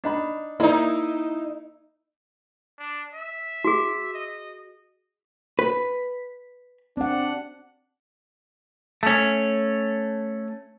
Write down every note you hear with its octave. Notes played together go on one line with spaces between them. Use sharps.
D4 D#4 B5
A#3 D#4 E4 D5 D#5
D4
E5
F#4 G#4
D#5
B4
C4 D4 F#5
A3 C#4